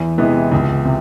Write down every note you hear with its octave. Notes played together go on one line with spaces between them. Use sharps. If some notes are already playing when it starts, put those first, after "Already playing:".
Already playing: E2
C3 E3 G#3 B3
C#2
C3